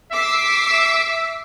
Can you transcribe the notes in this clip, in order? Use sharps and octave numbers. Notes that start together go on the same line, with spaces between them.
E5 D6 E6 C7